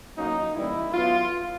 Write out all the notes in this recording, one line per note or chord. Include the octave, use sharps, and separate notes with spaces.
A2 F#3 A#3 C#4 D#4
A2 E3 G3 A#3 C#4 E4
A2 F#3 B3 F4